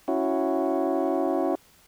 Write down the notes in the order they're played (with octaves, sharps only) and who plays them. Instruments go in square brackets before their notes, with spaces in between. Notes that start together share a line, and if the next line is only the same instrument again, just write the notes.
[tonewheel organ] C#4 E4 F#4